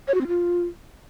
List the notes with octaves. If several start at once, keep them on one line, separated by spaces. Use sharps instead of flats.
C#5
F#4
C4
F4